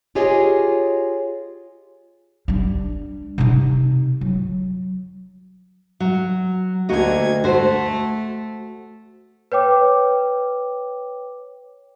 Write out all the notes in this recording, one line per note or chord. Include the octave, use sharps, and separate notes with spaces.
F4 G4 G#4 C#5 D#5
G3 D4
C3 D#4
F#3
F#3
D2 A#3 F#4 D#5 G#6
A3 F#4 C5
B4 C#5 G5 D6